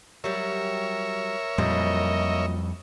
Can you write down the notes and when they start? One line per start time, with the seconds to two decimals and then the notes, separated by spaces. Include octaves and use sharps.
0.24 F#3 G3 A#4 C#5 E5
1.58 F2 A#2 F#3 G3 D#5